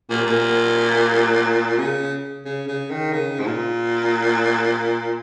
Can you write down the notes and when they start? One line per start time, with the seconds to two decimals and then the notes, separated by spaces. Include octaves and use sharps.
0.10 A#2
0.27 A#2
1.78 C#3
2.45 C#3
2.68 C#3
2.91 D#3
3.13 C#3
3.40 G#2
3.46 A#2